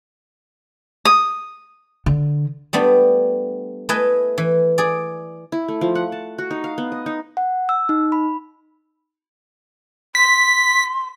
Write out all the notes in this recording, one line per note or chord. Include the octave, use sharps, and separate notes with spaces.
D#6
D3
G3 A3 B3 D4
A3 E4 B4 D#5 G#5
E3
G#4 D5
E4
A3
F3
F#5
A5
F#4
D#4
F5
B3
D#5
D#4
F#5
E6
D#4
B5
C6 B6